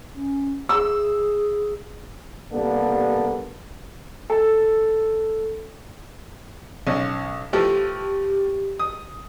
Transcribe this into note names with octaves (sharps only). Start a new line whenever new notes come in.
C#4
G#4 E6
C3 G3 A#3 B3 D4 A4
A4
B1 C#4
E3 F3 A3 G4
D#6